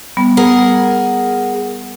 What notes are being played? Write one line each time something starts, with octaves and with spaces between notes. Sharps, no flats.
G3 B3
G#4 A#4 F#5